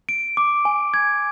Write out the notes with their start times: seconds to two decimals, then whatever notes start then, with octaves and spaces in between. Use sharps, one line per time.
0.09 D7
0.37 D6
0.65 G#5
0.94 G#6